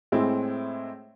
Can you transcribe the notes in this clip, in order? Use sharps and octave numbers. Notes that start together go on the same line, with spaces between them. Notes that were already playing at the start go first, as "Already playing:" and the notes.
A2 G#3 C4 E4